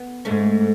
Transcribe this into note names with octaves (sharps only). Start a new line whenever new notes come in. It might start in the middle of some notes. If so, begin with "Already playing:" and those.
Already playing: B3
G#2 A3 C#4